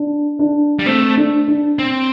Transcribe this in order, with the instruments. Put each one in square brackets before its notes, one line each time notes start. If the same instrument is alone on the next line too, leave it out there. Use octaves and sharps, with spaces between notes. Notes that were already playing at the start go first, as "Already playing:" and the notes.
Already playing: [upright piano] D4
D4
[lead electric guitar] G3
[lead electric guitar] A3 [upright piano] C4
[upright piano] D4
D4
[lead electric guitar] C4